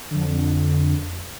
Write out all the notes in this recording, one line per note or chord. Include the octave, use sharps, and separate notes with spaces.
F2 D3